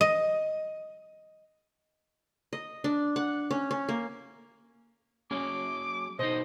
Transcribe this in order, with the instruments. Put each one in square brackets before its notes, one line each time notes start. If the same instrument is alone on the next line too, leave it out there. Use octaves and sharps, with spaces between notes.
[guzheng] D#5
[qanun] D#5
D4
F#5
C#4
C#4
A#3
[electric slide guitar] F#3 A#3 G#4 [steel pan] C#4 [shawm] D6
[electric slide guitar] B2 D3 D#4 [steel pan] C5 [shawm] D#5